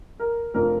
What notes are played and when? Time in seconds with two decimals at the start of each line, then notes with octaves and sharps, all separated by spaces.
0.20 A#4
0.54 F1 F2 D3 F3 A#4